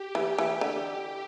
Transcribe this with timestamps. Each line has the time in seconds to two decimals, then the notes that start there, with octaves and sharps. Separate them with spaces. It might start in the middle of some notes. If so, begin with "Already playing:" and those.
Already playing: G4
0.15 E3 G4
0.38 E3
0.61 D3